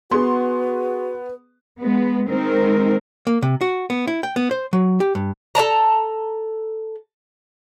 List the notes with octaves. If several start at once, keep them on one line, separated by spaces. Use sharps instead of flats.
B3 F#4 G#4 B4 C6
G#3 B3
D#3 G#3 C4 D#4 A#4
A#3
C3
F#4
B3
E4
G5
B3
C5
F#3
G4
G2
A4 D5 A5 A#5